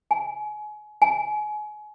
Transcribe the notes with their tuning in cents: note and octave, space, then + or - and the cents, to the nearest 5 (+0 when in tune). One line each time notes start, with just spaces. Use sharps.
G#5 +30
G#5 +30